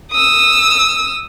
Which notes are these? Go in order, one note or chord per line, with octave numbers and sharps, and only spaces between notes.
D#6 E6